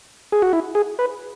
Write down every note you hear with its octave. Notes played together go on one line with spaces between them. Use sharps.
G#4
F#4
E4
G#4
B4